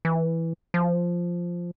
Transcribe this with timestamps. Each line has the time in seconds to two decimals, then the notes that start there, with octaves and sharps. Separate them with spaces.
0.05 E3
0.74 F3